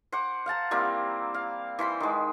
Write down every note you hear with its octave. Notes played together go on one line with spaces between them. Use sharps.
C5 F#5 D6
F5 F#5 A5 A#5
G3 A#3 C4 E4
F5
E3 C5 B5 C6
D#3 G#3